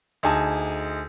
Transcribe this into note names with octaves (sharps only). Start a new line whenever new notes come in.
D2 D#4 G#4 G#5 A5